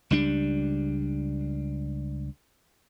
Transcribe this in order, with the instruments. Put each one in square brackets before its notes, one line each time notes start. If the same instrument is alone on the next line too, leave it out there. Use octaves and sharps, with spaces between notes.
[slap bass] C#2 G3 D4